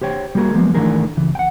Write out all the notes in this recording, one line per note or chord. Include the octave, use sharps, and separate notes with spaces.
G4 C5 C#5 G5
G3 A#3 F#4 G#4 A#4
F3 F#3 G#3 A#3 B3
D#3 E3 A3 D4 G#4 A#4
C#2 E3
F#5 G5